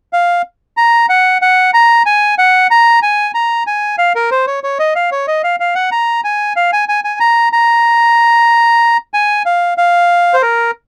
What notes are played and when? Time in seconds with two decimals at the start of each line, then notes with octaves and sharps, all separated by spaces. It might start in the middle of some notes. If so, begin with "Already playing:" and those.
0.13 F5
0.77 A#5
1.09 F#5
1.42 F#5
1.74 A#5
2.06 G#5
2.38 F#5
2.71 A#5
3.02 G#5
3.34 A#5
3.67 G#5
3.98 F5
4.15 A#4
4.31 C5
4.47 C#5
4.64 C#5
4.79 D#5
4.95 F5
5.12 C#5
5.27 D#5
5.44 F5
5.60 F5
5.75 F#5
5.92 A#5
6.24 G#5
6.56 F5
6.73 G#5
6.89 G#5
7.04 G#5
7.20 A#5
7.53 A#5
9.14 G#5
9.46 F5
9.78 F5
10.34 C5
10.42 A#4